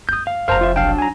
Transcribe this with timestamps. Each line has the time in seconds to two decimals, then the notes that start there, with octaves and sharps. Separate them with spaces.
0.09 F#1 G#3 D#6 G6
0.27 F5
0.48 F1 A#4 C5 F5 A5 A#5
0.61 F4 E5
0.76 B1 F#3 D4 F5 G5 A5
0.98 G#5 A#5